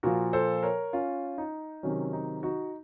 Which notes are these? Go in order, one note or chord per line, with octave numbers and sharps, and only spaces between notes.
A#2 F3 F#4 A#4
A4 C5
A#4 C#5
C#4 F4
D#4
C3 D#3 F#3 C#4
D#4
D#4 F#4